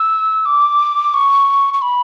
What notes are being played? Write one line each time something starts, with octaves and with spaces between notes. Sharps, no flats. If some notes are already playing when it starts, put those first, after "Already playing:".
Already playing: E6
D6
C#6
C#6
B5